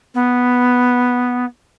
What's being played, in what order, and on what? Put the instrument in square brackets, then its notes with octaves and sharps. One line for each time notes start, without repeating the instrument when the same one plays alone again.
[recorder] B3